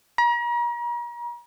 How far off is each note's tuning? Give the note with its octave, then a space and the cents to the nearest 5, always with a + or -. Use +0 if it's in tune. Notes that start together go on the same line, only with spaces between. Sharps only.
A#5 +40